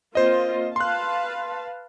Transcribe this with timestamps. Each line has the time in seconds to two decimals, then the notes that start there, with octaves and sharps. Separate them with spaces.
0.15 A#3 C4 F4 C5 D#5
0.76 B4 F5 A5 C6 F#6